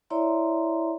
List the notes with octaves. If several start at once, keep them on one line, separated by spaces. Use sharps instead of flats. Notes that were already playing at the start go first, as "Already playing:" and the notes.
E4 C#5 D5 E5 A#5 C6